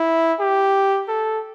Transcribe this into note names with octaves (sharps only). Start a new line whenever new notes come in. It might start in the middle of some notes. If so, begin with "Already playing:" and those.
Already playing: E4
G4
A4